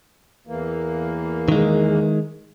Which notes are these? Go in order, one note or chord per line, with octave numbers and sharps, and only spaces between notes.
E2 E3 A#3
D#3 G#3